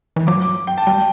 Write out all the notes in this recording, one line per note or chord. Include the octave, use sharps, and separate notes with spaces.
E3
F#3 D6
D6
G5
A5
G3 G5